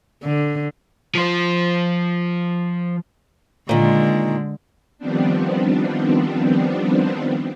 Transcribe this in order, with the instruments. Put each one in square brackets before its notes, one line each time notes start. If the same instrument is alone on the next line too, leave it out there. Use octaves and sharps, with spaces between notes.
[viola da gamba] D3
[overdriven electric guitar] F3 C5
[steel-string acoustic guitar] A#2 D#3 [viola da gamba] D3 G#3
[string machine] D#3 F3 G3 B3 C4 D4